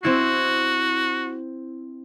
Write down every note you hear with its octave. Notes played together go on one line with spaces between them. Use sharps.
C4 E4 F#4 C7